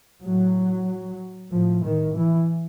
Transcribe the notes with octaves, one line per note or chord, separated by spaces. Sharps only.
A2 F#3
A2 F3
D#3
E3